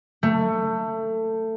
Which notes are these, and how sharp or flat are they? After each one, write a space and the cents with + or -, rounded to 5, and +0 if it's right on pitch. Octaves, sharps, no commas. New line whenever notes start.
A3 +20